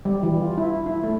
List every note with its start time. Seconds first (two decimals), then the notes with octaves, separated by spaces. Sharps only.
0.05 G3
0.23 E3
0.40 F4
0.58 E4
0.86 E4
1.03 A3